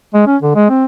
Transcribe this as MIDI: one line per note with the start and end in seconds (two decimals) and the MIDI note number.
0.14 0.23 56
0.27 0.37 61
0.42 0.55 50
0.55 0.68 56
0.70 0.85 60